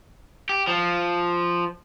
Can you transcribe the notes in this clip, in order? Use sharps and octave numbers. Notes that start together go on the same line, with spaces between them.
G4
F3